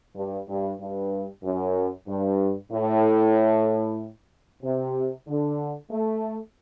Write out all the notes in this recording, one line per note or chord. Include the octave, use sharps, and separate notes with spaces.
G2
G2
G2
F#2
G2
A2
C3
D3
A3